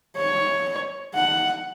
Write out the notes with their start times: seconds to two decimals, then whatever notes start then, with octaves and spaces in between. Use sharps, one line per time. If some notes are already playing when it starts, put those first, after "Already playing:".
0.16 C#5
1.15 F#5